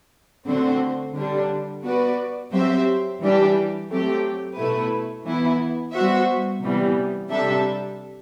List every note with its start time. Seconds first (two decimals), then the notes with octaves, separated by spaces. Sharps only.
0.47 D3 A3 C4 F#4 C5
1.16 D3 G3 D4
1.84 B3 F#4 B4 D5
2.51 F#3 C4 G4 C5 E5
3.20 E3 G3 D4 G4
3.89 F#3 A3 C4 G4
4.56 B2 A3 E4 B4
5.25 E3 B3 E4
5.93 G3 B3 F#4 C5 E5
6.62 C3 E3 G3 B3
7.29 C3 G3 D4 A4 E5